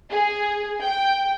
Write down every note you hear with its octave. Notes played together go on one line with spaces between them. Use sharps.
G#4
G5